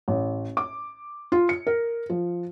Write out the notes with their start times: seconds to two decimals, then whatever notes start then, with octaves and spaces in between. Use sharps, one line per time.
0.08 A1
0.57 D6
1.32 F4
1.49 C#7
1.67 A#4
2.10 F3